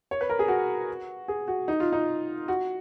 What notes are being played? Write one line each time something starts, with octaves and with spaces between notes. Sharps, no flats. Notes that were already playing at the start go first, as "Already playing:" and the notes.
C#5
B4
A#4
G#4
F#4
G#4
F#4
D#4
F4
D#4
F#4